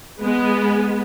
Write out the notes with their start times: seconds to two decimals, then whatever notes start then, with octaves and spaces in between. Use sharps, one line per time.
0.22 G#3 B3